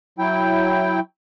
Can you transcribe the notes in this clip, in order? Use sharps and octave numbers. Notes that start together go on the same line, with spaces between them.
F#3 E4 G5